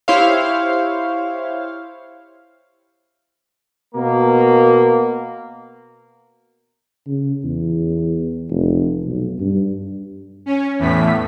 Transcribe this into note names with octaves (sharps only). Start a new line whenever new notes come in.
E4 G4 C5 C#5 F5
B2 A#3
C#3
E2
F1
B1
G2
C#4
E2 A2 B6